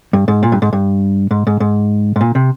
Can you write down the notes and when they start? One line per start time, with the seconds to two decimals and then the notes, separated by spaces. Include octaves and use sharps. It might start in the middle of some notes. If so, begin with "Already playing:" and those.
0.13 G2
0.28 G#2
0.43 A#2
0.52 G2
0.62 G#2
0.73 G2
1.31 G#2
1.47 G#2
1.60 G#2
2.16 G#2
2.21 A#2
2.35 C3